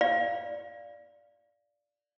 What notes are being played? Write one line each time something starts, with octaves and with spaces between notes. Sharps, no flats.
D5 F5